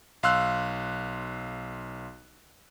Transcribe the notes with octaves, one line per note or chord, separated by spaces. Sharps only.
B1 F5 C6 E6 F#6